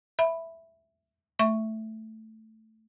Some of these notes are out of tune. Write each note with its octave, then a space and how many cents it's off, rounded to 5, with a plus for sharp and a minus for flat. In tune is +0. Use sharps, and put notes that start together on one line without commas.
E5 +0 B5 +0
A3 +0 E5 +0 C#6 +0